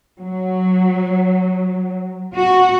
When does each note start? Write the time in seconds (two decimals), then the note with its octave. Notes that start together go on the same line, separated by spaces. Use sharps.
0.21 F#3
2.34 F#4